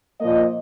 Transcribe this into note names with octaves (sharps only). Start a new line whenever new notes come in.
A#2 F3 A#3 D#5